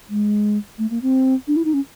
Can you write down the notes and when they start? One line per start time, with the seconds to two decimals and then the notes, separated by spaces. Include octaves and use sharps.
0.09 G#3
0.78 A3
0.90 A#3
1.02 C4
1.48 D4
1.56 E4
1.65 D#4
1.74 C#4